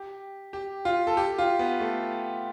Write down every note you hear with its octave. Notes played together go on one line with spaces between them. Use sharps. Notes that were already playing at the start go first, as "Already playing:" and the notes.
Already playing: G4
G4
F4
A4
G4
F4
B3
A3